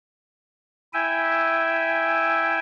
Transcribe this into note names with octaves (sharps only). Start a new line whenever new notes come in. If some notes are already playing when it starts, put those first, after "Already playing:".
E4 E5 G5 G#5